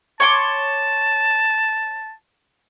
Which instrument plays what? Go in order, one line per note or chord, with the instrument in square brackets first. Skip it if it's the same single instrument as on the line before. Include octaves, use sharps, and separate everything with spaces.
[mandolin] C#5 C6 D6 [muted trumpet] A5